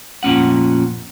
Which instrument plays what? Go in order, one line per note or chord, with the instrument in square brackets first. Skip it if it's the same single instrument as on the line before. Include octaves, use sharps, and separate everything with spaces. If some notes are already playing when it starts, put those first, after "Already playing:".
[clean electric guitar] F2 A#2 C#4 F#5